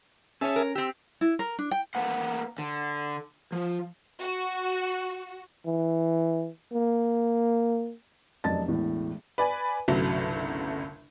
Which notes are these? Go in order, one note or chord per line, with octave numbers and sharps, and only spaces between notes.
C#4 G#4 C#5 E5 G#5 A5
A#4
C4 G4 E6
E4
A#4
D4
G5
A#3 B4 F#5
D3
F3
F#4
E3
A#3
F1 F#2 D5 D#5 A5 A6
E1 E2 A2
B4 D5 G#5
G1 C2 C#3 F#3 A3